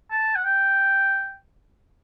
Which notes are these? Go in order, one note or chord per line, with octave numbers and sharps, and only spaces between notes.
A5
F#5
G5